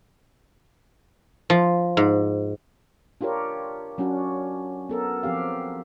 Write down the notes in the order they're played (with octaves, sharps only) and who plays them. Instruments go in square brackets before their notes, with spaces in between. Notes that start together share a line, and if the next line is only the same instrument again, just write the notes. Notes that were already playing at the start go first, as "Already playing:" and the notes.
[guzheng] F3
G#2
[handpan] D4 F4 G4 A#4 C#5
F#3 C#4 D4 F#4
B3 A4 A#4
F3 C4 G4 F5